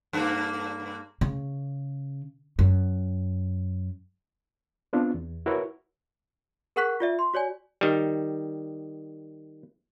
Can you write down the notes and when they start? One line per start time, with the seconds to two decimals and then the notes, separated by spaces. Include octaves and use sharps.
0.13 G2 A#3
1.21 C#3
2.59 F#2
4.93 B3 C4 D4 F4
5.14 E2
5.46 E4 F#4 A#4 B4 C#5
6.76 G#4 A#4 F#5 C#6 F#6 B6
7.00 F4 D5 E5
7.19 C6
7.34 F#4 C#5 D5 G#5
7.81 D#3 G3